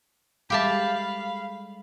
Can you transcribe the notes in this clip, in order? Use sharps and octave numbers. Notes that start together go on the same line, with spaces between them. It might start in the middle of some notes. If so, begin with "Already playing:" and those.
G3 G#3 G4 A4 E5 F5 A5 B5